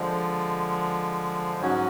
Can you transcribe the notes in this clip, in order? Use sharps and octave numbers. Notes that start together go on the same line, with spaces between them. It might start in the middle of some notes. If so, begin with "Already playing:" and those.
Already playing: D3 F3 G#3
G#2 F#3 C#4 F#4